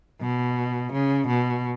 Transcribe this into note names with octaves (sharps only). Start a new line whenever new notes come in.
B2
C#3
B2